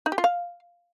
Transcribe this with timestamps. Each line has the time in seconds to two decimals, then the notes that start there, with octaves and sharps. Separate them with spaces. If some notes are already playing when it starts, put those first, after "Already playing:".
0.06 D#4
0.12 G4
0.18 F4
0.24 F5